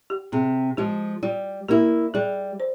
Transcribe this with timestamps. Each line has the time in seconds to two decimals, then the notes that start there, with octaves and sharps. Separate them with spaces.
0.10 G4
0.32 C3 G#4
0.77 F3 G#3 G4
1.23 G3 F4
1.68 A#3 E4 G4
2.14 G3 G#4
2.60 C5